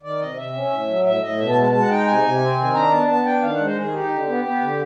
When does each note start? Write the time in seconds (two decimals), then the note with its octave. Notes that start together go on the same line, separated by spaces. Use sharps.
0.03 D#3 D5
0.19 C3 D#5
0.37 C3 E5
0.54 C#4
0.71 A2
0.87 F#3
1.04 A2 E5
1.22 A2 D#5
1.38 B2 E5
1.50 A5
1.56 G#3
1.62 A5
1.72 G#3 A5
1.81 F#5
1.89 D#4 G5
2.07 C3 G#5
2.23 C3
2.41 C4
2.58 D#3
2.74 D4 A#5
2.91 B3 A5
3.08 B3 A5
3.25 D4 G5
3.42 D#3 F5
3.54 F#5
3.59 G#3
3.65 C5
3.76 D#3 G#4
3.93 D#4 G4
4.10 D3
4.27 B3
4.44 B3
4.60 D3